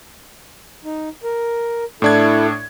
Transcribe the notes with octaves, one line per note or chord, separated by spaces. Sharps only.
D#4
A#4
A2 D4 E4 A4 G#6